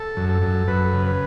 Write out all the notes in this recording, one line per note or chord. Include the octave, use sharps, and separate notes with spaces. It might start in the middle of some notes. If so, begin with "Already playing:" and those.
Already playing: A4
F#2
A4
F#2
F#2 B4
C#3
B4